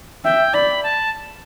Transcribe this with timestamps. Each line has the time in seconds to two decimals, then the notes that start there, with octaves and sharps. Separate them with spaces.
0.24 E5 G5
0.53 D5 B5
0.83 A5